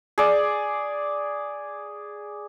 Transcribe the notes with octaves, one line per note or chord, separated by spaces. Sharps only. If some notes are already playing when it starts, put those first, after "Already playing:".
G#4 D5